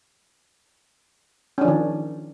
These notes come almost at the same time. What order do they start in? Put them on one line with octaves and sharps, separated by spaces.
C#4 D4 F3 D#3